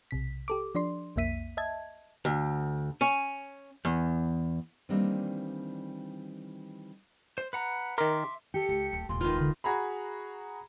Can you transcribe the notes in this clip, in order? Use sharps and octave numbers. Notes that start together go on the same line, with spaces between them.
B1 C3 B6
G4 A4 D6
F3 D4 D5 C6
B1 F2 A#3 E5 B6 D#7
D#5 E5 A5 G#6
D2
C#4
E2
D#3 E3 G3 A#3 C4 D4
C5
B4 F#5 A#5
D#3 A#4 E5 C6 D6
G4 A4 C#7
C#2
D1
D#1 C#2 A#2 C6
D#3 F4 B4
D3
F#4 G#4 A#5 B5